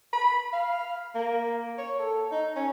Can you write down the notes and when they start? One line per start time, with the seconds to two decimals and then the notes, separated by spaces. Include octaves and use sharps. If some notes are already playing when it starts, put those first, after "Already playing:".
0.13 B5
0.53 F5
1.15 A#3
1.78 C#5
1.99 A4
2.32 D#4
2.56 C#4